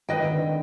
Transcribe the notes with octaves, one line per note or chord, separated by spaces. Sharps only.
D#3 B4 D#5 G5
D3